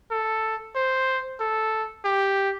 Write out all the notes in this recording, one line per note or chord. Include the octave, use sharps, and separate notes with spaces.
A4
C5
A4
G4